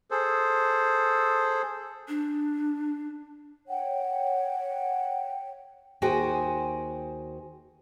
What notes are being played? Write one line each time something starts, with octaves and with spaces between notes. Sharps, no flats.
G#4 A4 C5
D4
C#5 F#5 G5
D#2 F#4 G#4 C5 G5 G#5